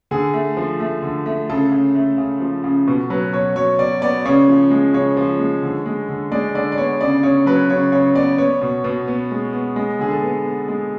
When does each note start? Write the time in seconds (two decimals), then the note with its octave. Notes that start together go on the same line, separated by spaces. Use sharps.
0.11 D3 G#4
0.34 A3
0.57 F3
0.80 A3
1.02 D3
1.26 A3
1.49 C#3 A4
1.72 C#3
1.95 A3
2.18 C#3
2.40 F3
2.64 C#3
2.87 B2
3.10 F#3 B4
3.33 B2 C#5
3.56 F#3 C#5
3.79 B2 D5
4.02 B3 D5
4.25 C#3 C#5
4.48 F3
4.70 G#3
4.94 C#3 C#5
5.17 F3
5.39 G#3
5.63 D3
5.86 G#3
6.09 D3
6.32 G#3 D5
6.55 D3 D5
6.72 D5
6.78 B3 C#5
7.01 C#3 D5
7.23 C#3 C#5
7.46 F#3 B4
7.69 C#3 C#5
7.92 C#3 C#5
8.15 B3 D5
8.38 B3 C#5
8.61 B2
8.84 B2
9.08 B3
9.31 G#3
9.53 B3
9.76 G#3
9.99 D3 G#4
10.11 A4
10.23 B3
10.45 B3
10.68 G#3